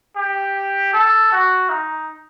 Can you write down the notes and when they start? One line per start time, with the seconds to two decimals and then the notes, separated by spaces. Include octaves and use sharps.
0.16 G4
0.93 A4
1.32 F#4
1.69 D#4